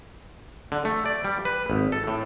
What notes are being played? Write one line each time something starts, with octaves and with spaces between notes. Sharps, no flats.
D3
A3
D5
G3
B4
G#1
A4
A2